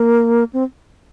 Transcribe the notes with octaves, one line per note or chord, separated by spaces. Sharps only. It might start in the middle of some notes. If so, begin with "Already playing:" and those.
Already playing: A#3
C4